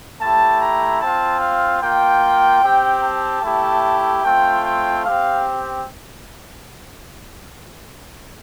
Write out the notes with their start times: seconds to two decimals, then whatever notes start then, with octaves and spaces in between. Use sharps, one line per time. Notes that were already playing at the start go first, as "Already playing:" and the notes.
0.20 A3 E4 G4 A5
0.61 A#5
1.00 C4 F4 A5
1.41 F5
1.81 A#3 F4 G5
2.62 C4 G4
3.03 A5
3.43 A3 E4 G4
4.24 A3 C4 F4 G5
4.64 G5
5.04 C4 G4 F5